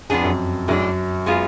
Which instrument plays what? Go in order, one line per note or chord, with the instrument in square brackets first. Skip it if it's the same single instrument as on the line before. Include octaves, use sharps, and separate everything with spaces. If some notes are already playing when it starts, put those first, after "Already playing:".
[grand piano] F2 [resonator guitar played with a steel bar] F3 B3 D4 G#4
[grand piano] F#2
[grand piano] F#2 [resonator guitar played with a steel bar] A2 G#3 D4
[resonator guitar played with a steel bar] G#3 B3 F4 G#4